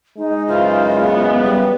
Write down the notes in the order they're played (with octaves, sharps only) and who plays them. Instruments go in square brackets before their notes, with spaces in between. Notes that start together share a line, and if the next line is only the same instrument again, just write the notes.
[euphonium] G#3 [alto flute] D#4
[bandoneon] F#2 C#3 E3 [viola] D#4 C5 [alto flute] F4
[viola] B3
[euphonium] G3 [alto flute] B4